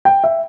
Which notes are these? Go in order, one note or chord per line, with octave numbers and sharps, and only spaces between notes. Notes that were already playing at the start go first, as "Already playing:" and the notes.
G5
E5